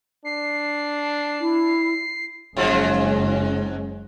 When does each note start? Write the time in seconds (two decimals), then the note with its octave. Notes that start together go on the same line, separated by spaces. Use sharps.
0.25 D4 C7
1.41 E4
2.57 F#1 G#2 F3 F#3 G#3 C#4